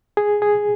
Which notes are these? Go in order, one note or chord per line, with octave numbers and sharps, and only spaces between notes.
G#4
G#4